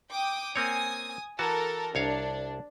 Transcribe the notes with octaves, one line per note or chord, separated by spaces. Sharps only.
G5 D6 D#6
A#3 C4 C#5 G#5 D#6
E3 F#4 A4 A#4 A5
C2 D4 C#5 F5